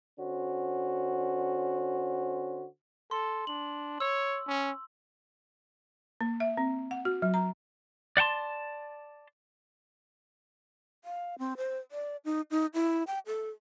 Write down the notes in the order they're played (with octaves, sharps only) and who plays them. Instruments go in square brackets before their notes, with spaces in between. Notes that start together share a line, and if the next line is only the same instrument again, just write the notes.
[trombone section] D3 C#4 F#4 C5
[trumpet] A4 [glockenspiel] C6
[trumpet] D4 [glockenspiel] F#7
[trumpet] C#5 [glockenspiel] E6
[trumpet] C#4
[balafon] A#3
E5
C4
F#5
F#4
F#3
A#5
[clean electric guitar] D5 F#5 G5 A5 C6
[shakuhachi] F5
C4
C5
D5
D#4
D#4
E4
G5
A4